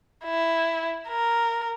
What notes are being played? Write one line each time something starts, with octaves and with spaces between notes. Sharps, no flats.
E4
A#4